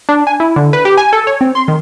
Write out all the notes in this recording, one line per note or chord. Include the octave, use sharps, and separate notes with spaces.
D4
G#5
E4
D3
B4
G4
G#5
A4
C#5
C4
C6
D#3